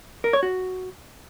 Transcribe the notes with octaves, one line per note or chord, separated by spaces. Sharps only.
A#4
C#5
F#4